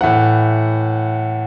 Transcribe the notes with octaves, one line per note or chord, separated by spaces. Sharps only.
A2 E3 F#5